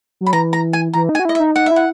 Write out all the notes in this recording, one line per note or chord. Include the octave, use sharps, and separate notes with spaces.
F#3
B5
E3 A#5
A#5
G#5
E3 A#5
D#4
G#5
F#4
E4 D#5
E5
D#4
D#4 F#5
E4 E5
F#5